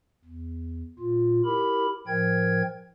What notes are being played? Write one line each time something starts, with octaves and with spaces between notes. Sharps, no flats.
E2
A#2 F4
E4 G4 A#4 B5
A2 F3 A#4 G5 G#6